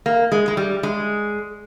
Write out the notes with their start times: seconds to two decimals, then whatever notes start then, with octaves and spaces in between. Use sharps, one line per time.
0.06 A#3
0.32 G#3
0.48 G#3
0.57 G3
0.83 G#3